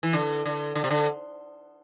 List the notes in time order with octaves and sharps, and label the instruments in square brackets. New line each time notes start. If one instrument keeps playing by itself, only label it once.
[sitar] E3
D3
D3
D3
C3
D3